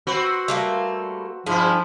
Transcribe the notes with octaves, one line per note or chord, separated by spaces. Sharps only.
C4 F#4 B4
G3 A3 A#3
G2 F3 E4 G#4